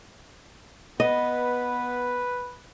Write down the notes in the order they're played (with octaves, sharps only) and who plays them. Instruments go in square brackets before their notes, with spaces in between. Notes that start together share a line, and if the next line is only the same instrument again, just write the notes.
[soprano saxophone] B3 [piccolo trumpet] B4 [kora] D#5